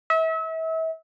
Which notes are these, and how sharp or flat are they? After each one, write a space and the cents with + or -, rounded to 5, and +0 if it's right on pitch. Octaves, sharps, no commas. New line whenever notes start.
E5 -35